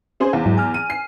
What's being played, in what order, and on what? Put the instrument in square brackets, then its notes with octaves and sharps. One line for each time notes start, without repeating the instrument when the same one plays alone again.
[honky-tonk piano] C#4 G#4 C5
[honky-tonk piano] E2 [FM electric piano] F5
[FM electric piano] G#2 F#3 E4
G#5 F6
[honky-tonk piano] D#7
C7